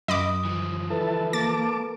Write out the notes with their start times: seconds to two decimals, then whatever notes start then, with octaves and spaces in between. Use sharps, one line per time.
0.08 F#2 D#5 B5 D6 D#6
0.45 E3 F3
0.90 E4 A4 B4 A5
1.33 A#3 A5 D6 A6